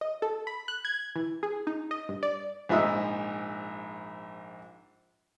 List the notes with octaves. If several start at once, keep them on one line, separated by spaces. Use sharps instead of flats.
D#5
A4
B5
F#6
G#6
E3
G#4
D#4
D#5
G2
D5
A#1 G#2 F3 E5 D#6